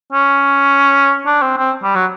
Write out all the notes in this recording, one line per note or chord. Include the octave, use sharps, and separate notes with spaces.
C#4
D4
C4
C4
G3
F#3